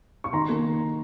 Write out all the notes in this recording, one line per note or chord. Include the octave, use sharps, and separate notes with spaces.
C#6
D#3 A#5 C6
A#3